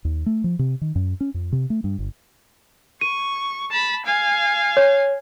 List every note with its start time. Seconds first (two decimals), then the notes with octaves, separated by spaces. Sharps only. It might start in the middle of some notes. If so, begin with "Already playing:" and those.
0.05 D#2
0.26 A3
0.44 F3
0.59 C3
0.81 D#3
0.95 F#2
1.20 C#4
1.34 F2
1.52 C3
1.70 A3
1.84 G2
1.99 G1
3.01 C#6 D#7
3.71 A5 B5
4.05 F5 G#5
4.77 C#5